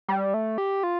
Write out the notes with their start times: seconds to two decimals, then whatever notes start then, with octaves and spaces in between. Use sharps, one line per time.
0.08 G3
0.34 A3
0.58 G4
0.83 F4